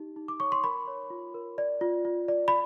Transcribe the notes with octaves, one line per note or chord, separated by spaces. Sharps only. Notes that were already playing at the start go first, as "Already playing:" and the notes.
Already playing: D#4 G4
D#4
D6
C#5 C#6
C6
A#4 B5
C#5
F4
A#4
D5
F4
F4
D5
B5